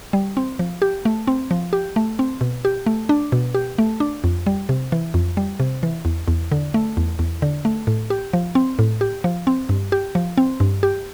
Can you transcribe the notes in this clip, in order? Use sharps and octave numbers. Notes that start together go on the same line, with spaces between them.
G3
C4
F3
G4
A3
C4
F3
G4
A3
C4
B2
G4
A3
D4
B2
G4
A3
D4
F2
G3
C3
E3
F2
G3
C3
E3
E2
E2
D3
A3
E2
E2
D3
A3
A2
G4
F3
C4
A2
G4
F3
C4
G2
G4
F3
C4
G2
G4